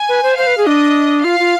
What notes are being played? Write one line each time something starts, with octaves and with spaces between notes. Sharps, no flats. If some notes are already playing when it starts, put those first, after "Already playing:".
Already playing: G#5
B4
C5
C5 F5
B4
G#4
D4 D#5
F4 F5
F4